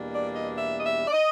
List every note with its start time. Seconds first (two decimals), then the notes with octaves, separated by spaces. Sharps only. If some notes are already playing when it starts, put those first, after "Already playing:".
Already playing: E2 B2 G3 A#3 D4
0.14 D5
0.35 D#5
0.57 E5
0.79 D#5
0.84 E5
1.08 D5
1.12 D#5